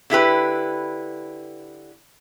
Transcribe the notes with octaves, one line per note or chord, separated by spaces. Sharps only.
D3 E4 G4 B4